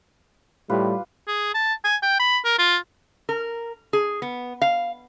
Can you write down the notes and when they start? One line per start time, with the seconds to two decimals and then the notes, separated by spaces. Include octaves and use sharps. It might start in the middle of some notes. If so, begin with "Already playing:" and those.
0.69 A2 G3 F4 G4 B4
1.28 G#4
1.55 A5
1.85 G#5
2.03 G5
2.20 B5
2.45 A#4
2.59 F4
3.29 A#4
3.93 G#4
4.22 B3
4.62 F5